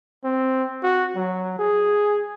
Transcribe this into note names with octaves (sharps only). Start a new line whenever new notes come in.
C4
F#4
F#3
G#4